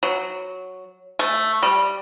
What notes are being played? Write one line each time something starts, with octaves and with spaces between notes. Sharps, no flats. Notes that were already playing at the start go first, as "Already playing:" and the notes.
F#3
A3
G3